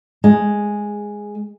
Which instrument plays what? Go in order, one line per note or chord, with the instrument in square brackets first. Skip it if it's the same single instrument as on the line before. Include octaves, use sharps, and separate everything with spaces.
[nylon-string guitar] G#3